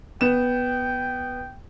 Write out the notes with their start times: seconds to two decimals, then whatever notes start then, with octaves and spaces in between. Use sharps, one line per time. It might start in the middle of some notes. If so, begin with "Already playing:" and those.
0.21 B3 G5 E7